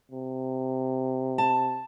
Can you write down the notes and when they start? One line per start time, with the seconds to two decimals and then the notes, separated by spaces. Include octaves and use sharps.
0.12 C3
1.38 A5